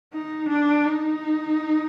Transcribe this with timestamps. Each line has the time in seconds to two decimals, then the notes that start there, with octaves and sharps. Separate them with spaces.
0.13 D#4
0.49 D4
0.85 D#4